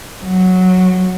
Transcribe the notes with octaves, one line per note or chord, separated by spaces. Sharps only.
F#3